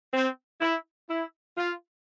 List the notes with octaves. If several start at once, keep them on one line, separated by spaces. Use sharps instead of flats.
C4
E4
E4
F4